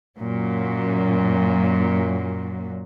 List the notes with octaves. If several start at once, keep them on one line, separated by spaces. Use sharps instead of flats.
F#2 A#2 F#3